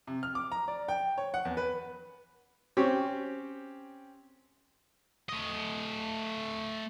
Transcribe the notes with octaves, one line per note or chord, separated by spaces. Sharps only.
C3
F6
D6
A#5
D5
G5
C#5
F#5
E2
B4
C4 C#4 G4 C#5
A3 D#5